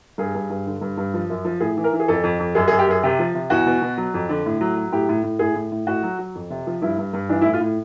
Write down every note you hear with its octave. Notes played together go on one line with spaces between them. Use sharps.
G2 G#4
G2
G2
D3
G2
G2
F3
F#2
F3
A2 G#4
E3
A#4
E3
G#4
F2 A4
F2
F2
F#2 G#4
G#4
F#2
G4
F#2 G#4
C3 G4
F3
C3
E2 F#4
B2
B2
F#3
F2
D3
A2
F#3
F#3
A2 G4
A2
A2
A2 G#4
A2
A2
A2 F#4
F#3
F#3
F2
C3
F3
G2 E4
G2
G2
E3 D4
E4
A2
F4
A2